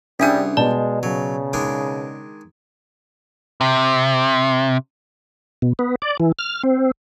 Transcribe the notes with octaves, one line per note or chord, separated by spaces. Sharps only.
C2 G3 C#4 D4 G#4 E5 F#5 G#5
B2 G#3 D5 A5
C#3 F#3
D#3 G#3 D4
C3
B2
B3
D5
E3
F6
C4